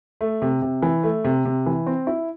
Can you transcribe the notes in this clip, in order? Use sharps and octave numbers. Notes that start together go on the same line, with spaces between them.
A3
C3
C3
E3
A3
C3
C3
E3
C4
E4